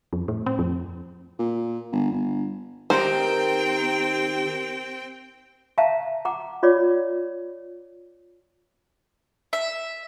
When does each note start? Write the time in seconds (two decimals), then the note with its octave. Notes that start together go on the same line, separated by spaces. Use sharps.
0.13 F2
0.28 A2
0.46 C4
0.59 F2
1.39 A#2
1.92 G1
2.12 G1
2.90 D#3 C4 G4 A#4 C5 G5
5.78 E5 F5 A5 A#5
6.25 F#5 A#5 D6
6.63 F4 C#5 D5 D6
9.53 E5